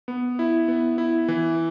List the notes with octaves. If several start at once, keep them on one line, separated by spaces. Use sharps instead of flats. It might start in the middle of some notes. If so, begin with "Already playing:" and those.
B3
E4
B3
E4
E3